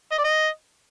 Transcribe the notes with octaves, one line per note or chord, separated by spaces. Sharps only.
D#5
D5
D#5